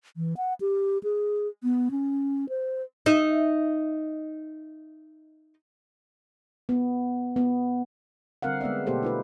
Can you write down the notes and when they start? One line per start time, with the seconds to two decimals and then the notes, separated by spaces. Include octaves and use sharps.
0.17 E3
0.37 F#5
0.61 G4
1.03 G#4
1.63 B3
1.91 C#4
2.49 C5
3.06 D#4 E5
6.69 B3
7.36 B3
8.42 D3 G3 C4 A#4 F5 F#5
8.61 G#3 B3 D5 E5
8.86 B2 A#3 B3 G4 A4 C5
9.03 D#4 F4 B4